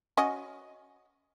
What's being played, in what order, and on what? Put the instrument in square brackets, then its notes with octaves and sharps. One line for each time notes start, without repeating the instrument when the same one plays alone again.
[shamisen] C#4 F#4 D#5